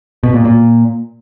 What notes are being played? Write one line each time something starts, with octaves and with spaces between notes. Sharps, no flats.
B2
A#2
A#2